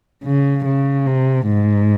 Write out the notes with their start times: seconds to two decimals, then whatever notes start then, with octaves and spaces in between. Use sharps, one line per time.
0.24 C#3
0.65 C#3
1.06 C3
1.46 G#2